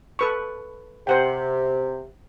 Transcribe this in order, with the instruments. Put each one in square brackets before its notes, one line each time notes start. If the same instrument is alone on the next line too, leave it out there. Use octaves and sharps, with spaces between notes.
[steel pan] A4 B4 C#6
[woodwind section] C3 [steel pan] C5 F#5 G5